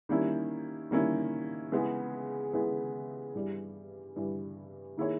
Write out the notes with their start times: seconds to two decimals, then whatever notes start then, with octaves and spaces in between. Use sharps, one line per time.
0.09 D#3 G3 A#3 C#4 E4
0.91 D#3 G3 A#3 C#4 E4
1.72 C#3 E3 G#3 B3
2.53 C#3 E3 G#3 B3
3.34 G2 E3 G3
4.16 G2 E3 G3
4.97 D#3 A#3 E4 G#4 C#5